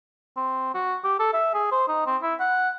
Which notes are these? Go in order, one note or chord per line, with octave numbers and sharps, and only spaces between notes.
C4
F#4
G4
A4
E5
G#4
C5
D#4
C4
E4
F#5